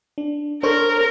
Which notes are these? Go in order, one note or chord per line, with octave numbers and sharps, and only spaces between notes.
D4
D4 A#4 C5 C#5